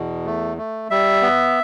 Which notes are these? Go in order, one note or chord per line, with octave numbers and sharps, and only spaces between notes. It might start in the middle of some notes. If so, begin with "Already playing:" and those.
Already playing: E2 B2
A3
A3
G3 E5
B3